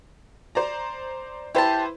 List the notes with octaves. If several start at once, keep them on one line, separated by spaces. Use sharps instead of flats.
C5 D5 A#5
E4 G4 B4 C5 A5